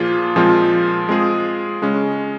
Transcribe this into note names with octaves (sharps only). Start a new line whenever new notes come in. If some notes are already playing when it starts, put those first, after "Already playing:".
Already playing: A#2 F3 A#3 F4 G#4
A#2 F3 G#3 C4 F4
G#3 C4 F4 G#4
C#3 G#3 C#4